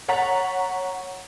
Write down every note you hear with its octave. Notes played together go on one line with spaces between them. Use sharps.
C#5 F#5 A#5 A6 B6